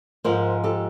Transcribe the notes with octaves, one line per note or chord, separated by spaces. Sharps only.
G#2 F3 G#3 A#4 C5
G4 A4